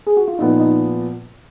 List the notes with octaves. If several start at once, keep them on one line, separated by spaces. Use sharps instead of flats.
G#4
F#4
F4
A#2 F3 B3 D#4
D#4